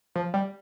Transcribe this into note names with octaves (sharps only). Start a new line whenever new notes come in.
F3
G3